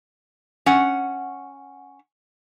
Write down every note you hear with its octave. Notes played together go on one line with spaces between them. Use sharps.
C#4 F#5